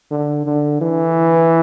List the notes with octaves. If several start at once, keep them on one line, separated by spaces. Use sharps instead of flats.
D3
D3
E3